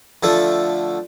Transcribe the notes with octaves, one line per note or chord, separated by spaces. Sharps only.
D3 F3 A3